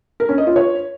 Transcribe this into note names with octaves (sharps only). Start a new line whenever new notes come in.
A#4
C#4
D#5
F4
C#5